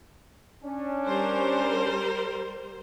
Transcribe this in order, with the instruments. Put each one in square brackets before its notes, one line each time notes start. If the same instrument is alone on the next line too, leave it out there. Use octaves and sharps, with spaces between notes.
[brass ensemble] C#4 D4
[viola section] G3 A#4 C5